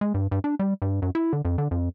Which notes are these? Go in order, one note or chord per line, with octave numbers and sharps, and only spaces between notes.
G#3
G2
G2
D4
G3
G2
F#2
E4
D3
F2
D3
F2